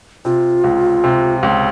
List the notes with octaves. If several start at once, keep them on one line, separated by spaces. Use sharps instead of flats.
C3 F4
C#2
C3
C#2